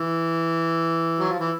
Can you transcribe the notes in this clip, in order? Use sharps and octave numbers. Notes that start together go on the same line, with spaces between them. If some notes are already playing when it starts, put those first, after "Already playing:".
Already playing: E3
F#3
F3
E3